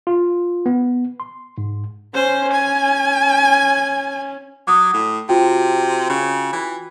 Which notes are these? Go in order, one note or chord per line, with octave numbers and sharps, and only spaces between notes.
F4
B3
C6
G#2
C#4 C5
G#5
F#3 D6 D#6
A2
C3 F4 F#4 G5
C#3
E3